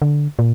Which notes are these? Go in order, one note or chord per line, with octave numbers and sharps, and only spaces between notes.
D3
A#2